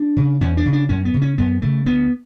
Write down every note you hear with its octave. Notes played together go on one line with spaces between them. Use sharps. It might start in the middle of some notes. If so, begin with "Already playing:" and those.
Already playing: D4
C#3
E2 C#4
D4
C#3
D4
F#2 C#4
B3
C#3
C#4
F#2 B3
C#3 A3
D2 B3